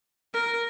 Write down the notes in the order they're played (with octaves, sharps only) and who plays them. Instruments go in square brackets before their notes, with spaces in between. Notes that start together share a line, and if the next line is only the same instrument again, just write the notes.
[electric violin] A#4